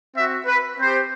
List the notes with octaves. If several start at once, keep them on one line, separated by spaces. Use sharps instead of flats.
C4 F#4 E5
B4
C4 G4 C5